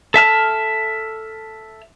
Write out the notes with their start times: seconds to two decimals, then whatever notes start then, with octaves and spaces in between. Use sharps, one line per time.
0.14 A4 E5 A5 F6